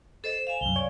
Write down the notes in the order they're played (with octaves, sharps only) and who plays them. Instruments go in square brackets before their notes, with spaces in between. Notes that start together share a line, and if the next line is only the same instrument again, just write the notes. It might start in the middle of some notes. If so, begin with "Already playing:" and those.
[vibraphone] A4 C5 D#5 [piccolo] E7
[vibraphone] F5 G#5 [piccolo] E7
[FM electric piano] C2 F#2 [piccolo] G7
[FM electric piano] C#5 [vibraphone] D5